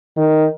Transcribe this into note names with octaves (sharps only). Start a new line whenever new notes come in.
D#3